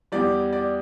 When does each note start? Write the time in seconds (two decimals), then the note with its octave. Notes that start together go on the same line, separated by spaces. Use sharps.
0.12 E2 E3 G3 D5
0.53 D5